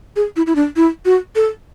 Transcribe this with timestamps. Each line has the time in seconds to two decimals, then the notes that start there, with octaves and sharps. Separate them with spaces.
0.16 G#4
0.36 E4
0.47 E4
0.55 D4
0.76 E4
1.05 F#4
1.36 A4